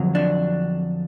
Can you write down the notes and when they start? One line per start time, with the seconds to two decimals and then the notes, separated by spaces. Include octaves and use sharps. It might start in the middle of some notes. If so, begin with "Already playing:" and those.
Already playing: F2 D3 F#3
0.15 D4